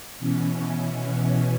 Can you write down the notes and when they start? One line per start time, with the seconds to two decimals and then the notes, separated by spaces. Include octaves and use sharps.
0.19 B2 E3 C#4